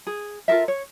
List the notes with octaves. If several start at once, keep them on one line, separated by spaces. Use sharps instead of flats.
G#4
F4 A4 A#4 E5
C#5